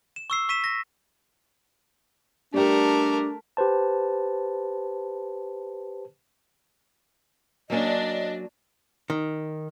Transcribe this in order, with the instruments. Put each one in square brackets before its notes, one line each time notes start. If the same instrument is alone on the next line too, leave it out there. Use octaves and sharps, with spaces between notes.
[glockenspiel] E7
C#6 E6 C7
C#6 B6 D#7 E7
A#6
[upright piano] G3 G4 [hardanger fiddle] A3 A#4 [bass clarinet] D4
[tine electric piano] G4 B4 C5 A5
[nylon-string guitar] F#3 A#3 C#4 [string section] D4 [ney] D#5
[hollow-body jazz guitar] D#3